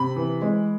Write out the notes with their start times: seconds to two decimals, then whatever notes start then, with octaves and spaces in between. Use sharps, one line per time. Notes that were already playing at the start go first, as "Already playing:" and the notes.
Already playing: C3 B5
0.16 E3
0.42 G#3